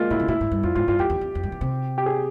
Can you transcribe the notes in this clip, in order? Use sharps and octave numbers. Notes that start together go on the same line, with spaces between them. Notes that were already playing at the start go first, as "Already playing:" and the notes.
Already playing: G#3 A#3 F4
A#2 E4
C3
A#2 E4
G#2
G2
F2 F4
G#2 F4
G2 F4
F2 G4
E2
F2
F2
G2
E3
C3
G4
G#4